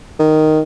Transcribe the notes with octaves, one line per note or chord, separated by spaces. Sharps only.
D#3